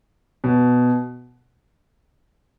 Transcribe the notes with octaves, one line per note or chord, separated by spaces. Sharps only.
B2